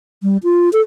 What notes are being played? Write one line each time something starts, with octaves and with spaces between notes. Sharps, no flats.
G3
F4
A4